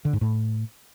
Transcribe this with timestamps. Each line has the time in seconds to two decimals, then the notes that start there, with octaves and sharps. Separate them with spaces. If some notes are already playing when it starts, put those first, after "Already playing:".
0.05 D3
0.13 G#2
0.21 A2